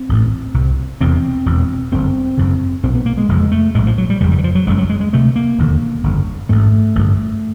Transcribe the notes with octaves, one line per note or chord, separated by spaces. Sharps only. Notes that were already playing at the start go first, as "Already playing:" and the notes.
Already playing: C4
A1 A2
C2 C3
E1 E2 C3 C4
E1 E2 B2
G1 F#2 D3 C4
F#1 F#2 C#3
B1 A#2 C4
B3
A#3
G#3
F1 F2 C#3 G#3
A3
A#1 A2 G#3
F3
F#3
G3
F#1 F2 C#3 G3
G3
E3
F3
F#3
F#1 F#2 C#3 G#3
F#3
G#3
G#3
D2 C3 A3
A#3
E1 D#2 D3
G1 F2 C#3
A1 G#2 A3
A1 G2 D3